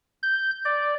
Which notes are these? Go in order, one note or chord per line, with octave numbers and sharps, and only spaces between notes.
G6
D5